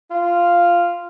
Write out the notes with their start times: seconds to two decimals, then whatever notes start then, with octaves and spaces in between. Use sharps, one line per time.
0.11 F4